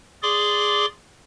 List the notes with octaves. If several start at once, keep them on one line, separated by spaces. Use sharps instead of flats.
G#4 D5 C6 D6